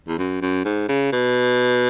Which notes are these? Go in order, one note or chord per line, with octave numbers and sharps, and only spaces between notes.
E2
F#2
F#2
G#2
C#3
B2